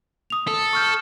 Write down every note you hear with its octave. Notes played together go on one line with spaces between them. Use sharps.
D#6 F7
A4
C#6 F6 G6